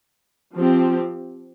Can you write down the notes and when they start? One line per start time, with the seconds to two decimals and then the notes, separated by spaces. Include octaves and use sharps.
0.56 F3 C4 G4